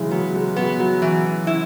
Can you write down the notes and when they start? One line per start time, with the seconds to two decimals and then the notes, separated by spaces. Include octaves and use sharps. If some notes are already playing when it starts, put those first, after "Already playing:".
Already playing: C#3 E3 F#3 G#3
0.11 F#3 B3
0.35 G#3
0.56 F#3 B3
0.80 F#3
1.02 E3
1.47 E4